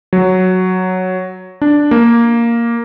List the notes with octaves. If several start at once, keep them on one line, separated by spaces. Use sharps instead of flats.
F#3
D4
A#3